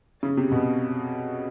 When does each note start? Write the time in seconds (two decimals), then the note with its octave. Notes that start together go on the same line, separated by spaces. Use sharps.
0.23 C#3
0.37 C3
0.52 B2